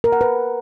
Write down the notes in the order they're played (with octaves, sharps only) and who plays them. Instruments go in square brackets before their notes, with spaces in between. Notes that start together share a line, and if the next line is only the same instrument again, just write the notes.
[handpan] A#4
F#5
B4